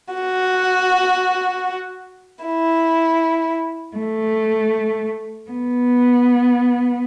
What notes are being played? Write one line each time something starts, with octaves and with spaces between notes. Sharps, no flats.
F#4
E4
A3
B3